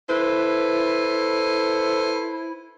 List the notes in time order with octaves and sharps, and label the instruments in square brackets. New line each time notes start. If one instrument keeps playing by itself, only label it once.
[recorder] E4 [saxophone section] A4 B4 C5